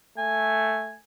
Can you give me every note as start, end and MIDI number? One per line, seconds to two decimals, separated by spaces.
0.18 0.96 57
0.18 0.97 80